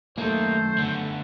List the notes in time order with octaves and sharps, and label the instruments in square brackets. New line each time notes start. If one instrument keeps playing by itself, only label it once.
[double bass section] F#2 D#3 A3 [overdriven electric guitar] A#3 D#4 [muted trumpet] C5
[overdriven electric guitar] D3 B3